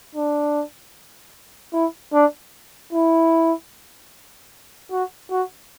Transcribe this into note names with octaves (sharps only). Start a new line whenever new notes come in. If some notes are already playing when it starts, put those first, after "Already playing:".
D4
E4
D4
E4
F#4
F#4